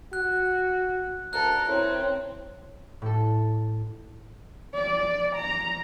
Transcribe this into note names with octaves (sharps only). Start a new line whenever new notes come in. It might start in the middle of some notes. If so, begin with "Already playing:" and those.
F#4 F#6
D2 A4 A#4 A#5 F#6
C4 E4 C#5
A2 A4
D5
A#5